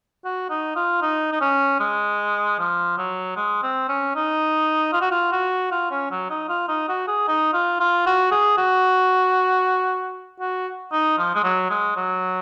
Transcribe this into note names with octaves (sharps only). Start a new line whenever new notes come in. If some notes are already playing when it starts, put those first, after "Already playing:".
F#4
D#4
F4
D#4
D#4
C#4
G#3
F3
F#3
G#3
C4
C#4
D#4
F4
F#4
F4
F#4
F4
C#4
F#3
D#4
F4
D#4
F#4
G#4
D#4
F4
F4
F#4
G#4
F#4
F#4
D#4
F3
G#3
F#3
G#3
F#3